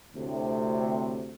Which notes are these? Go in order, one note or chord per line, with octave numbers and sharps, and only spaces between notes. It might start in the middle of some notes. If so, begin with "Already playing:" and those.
D2 A2 C3